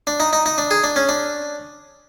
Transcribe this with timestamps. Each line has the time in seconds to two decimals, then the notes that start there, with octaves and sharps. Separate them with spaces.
0.07 D4
0.20 D#4
0.33 D#4
0.46 D#4
0.58 D4
0.71 G#4
0.84 D4
0.96 C#4
1.09 D4